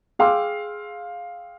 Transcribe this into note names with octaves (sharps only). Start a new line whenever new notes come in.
G#4 F5 G5 C6 D6 E6